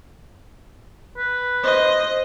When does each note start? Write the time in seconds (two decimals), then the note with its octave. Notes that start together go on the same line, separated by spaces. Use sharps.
1.18 B4
1.64 C5 D#5